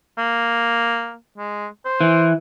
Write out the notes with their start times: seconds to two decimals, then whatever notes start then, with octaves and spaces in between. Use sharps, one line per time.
0.18 A#3
1.38 G#3
1.85 C5
2.01 E3